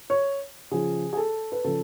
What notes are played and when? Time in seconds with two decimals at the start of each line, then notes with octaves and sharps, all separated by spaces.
0.10 C#5
0.71 C#3 F3 G#4
1.13 G#4
1.17 A4
1.52 B4
1.64 C#3 F3 A4